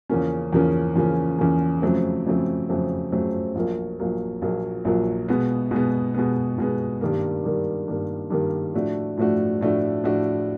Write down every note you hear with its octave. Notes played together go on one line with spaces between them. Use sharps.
E2 C#3 F3 A#3 C#4
E2 C#3 F3 A#3 C#4
E2 C#3 F3 A#3 C#4
E2 C#3 F3 A#3 C#4
F2 C#3 F#3 A3 C4
F2 C#3 F#3 A3 C4
F2 C#3 F#3 A3 C4
F2 C#3 F#3 A3 C4
A#1 A#2 F#3 A#3
A#1 A#2 F#3 A#3
A#1 A#2 F#3 A#3
A#1 A#2 F#3 A#3
B2 G#3 B3
B2 G#3 B3
B2 G#3 B3
B2 G#3 B3
G2 D#3 G3 A#3
G2 D#3 G3 A#3
G2 D#3 G3 A#3
G2 D#3 G3 A#3
A2 F3 A3 D4 F#4
A2 F3 A3 D4 F#4
A2 F3 A3 D4 F#4
A2 F3 A3 D4 F#4